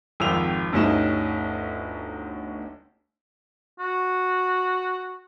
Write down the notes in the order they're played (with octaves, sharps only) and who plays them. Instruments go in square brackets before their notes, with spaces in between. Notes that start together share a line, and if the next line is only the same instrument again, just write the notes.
[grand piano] G#1 F2 F4 G5 E6 F7
G1 D2 G3 C#4 D#4 E7
[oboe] F#4